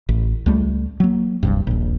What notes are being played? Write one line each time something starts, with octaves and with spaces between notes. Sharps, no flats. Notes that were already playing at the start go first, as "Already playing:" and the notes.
A1
C#2 G3 A3
F#3 A#3
E1 C2 G2
D#1 A#1